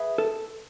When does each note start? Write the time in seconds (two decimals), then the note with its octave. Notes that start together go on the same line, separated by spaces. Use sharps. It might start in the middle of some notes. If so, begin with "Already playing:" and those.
Already playing: G#4 B4 E5 B5
0.18 A4